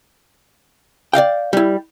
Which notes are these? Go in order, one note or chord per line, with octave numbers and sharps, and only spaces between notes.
D5 D#5 F5 G5
G3 E4